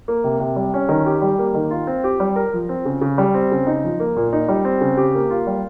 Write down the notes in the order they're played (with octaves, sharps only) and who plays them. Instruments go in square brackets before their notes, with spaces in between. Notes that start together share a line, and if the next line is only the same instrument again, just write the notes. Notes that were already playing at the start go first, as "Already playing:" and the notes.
[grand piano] A#3
C3
C3
G3
C#4
D#3
G4
G3
A#3
D#3
F4
C4
G4
G3
A#4
F3
C4
C#3
C#3
G3
C4
C#3
D#4
F3
A#3
A#2
D#4
G3
C4
C#3
G4
A#3
F4
G3